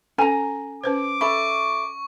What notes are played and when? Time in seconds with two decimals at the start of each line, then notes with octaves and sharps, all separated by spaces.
0.18 C#4 A4 G#5 A#5
0.84 C#4 B4 C5 D6
1.21 A4 E5 B5 C#6